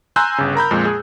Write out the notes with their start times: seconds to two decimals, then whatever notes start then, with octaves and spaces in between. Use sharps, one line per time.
0.16 G#5 A#5 C6 E6 F#6 G6
0.38 G1 C#3
0.55 A#4 A#5 B5 G6
0.71 F2 A#2 G#3
0.86 G#4